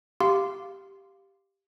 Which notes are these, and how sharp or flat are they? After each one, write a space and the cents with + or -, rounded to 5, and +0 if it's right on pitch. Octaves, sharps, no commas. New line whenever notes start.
G4 +0 F5 +0 C6 -15